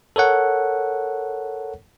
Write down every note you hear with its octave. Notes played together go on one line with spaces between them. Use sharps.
A4 A#4 C#5 F#5